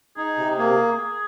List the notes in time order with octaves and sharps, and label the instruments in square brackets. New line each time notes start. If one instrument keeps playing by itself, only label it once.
[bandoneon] D#4 [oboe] G#4
[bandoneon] C3
[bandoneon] A#3 [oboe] G#4